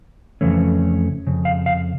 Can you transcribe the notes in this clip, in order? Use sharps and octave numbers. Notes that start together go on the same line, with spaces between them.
F2 C#3 E3 A3 C#4
F2 C#3
F5
F5